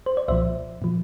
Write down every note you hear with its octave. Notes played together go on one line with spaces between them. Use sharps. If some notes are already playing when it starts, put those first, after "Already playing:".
C5
D5
C2 A#2 F3 C5 E5
A#2 F3